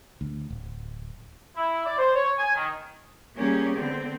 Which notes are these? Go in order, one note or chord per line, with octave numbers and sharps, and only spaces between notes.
D2
D1
E4
D5
C5
C#5
G#5
D#3
G3 A#3 C#4 G4 G#4
D3 B3 C4